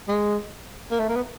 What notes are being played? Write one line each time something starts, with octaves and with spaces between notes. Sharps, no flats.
G#3
A#3
A3
A#3
B3